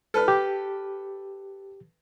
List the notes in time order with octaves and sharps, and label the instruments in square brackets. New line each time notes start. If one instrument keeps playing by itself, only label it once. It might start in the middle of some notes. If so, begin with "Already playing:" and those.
[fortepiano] A4 B4 F6
[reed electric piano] G4